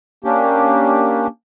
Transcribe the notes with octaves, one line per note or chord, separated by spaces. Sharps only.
A#3 C#4 D4 G4